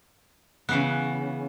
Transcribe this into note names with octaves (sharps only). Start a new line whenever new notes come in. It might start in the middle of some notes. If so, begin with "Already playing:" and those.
C#3 E3 B3